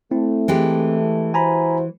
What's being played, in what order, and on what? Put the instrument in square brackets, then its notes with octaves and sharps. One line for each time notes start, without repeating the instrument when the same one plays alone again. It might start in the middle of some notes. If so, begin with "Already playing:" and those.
[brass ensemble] A3 [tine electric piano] C4 E4
[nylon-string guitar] E3 G#3 G4
[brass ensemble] E4 F#4 C5 [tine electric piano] G#5 A#5 B5